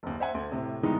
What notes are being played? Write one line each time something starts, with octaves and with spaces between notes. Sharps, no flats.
F#1 D#2
C5 E5 F#5 G#5
D2
A2 C3
G2 D#3 E3 G#3 B3 D#4